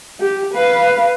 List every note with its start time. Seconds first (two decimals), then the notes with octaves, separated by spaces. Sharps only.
0.20 G4
0.54 B4 F5